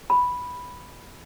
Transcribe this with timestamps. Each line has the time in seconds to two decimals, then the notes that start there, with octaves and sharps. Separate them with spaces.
0.10 B5